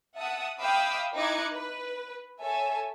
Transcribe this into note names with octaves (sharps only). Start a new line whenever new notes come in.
E5 F#5 A5 D#6
E5 F5 G5 B5 D6 D#6
D#4 E4 D6 F#6 G#6 C#7
B4
A4 C#5 E5 G#5